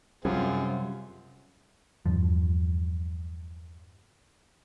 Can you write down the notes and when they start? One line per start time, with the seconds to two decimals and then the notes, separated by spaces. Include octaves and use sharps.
0.25 F#2 C3 G3 C4 F4 G#4
2.06 E2 G2 F3